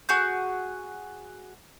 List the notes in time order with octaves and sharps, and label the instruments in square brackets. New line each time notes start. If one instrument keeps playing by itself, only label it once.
[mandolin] F#4 G#4 G6